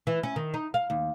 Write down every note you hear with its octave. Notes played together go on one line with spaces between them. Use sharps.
E3
C#4
D#3
D#4
F5
D#2